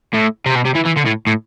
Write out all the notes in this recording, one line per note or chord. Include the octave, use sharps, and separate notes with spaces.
A2
C3
B2
C3
E3
E3
D3
A2
A2